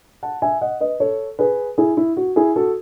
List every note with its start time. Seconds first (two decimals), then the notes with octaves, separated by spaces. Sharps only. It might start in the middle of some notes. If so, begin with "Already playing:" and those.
0.23 F#5 A5
0.42 E5 G#5
0.61 D#5 F#5
0.81 B4 D#5
1.00 A4 C#5
1.39 G#4 B4
1.78 E4 G#4
1.97 E4
2.17 F#4
2.36 E4 G#4
2.56 F#4 A4